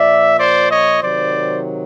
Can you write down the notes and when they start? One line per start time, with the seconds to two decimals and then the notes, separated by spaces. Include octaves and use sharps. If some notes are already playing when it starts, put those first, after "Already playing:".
Already playing: A#2 F3 D5 E5
0.38 C5 D5
0.70 C#5 D#5
1.02 C3 D#3 F#3 C5 D5